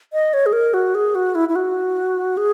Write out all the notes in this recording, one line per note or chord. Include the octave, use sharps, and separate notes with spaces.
D#5
C#5
G#4
A#4
F#4
G#4
F#4
E4
E4
F#4
G#4